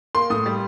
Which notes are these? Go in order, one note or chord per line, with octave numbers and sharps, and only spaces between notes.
A#3 C6
A2 D#6
G3